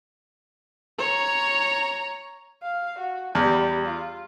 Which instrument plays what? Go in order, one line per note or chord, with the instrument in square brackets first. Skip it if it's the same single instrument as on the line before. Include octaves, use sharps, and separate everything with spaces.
[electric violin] C#5 A#5
[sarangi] F5
F#4
[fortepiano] E2 [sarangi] G3
[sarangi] F4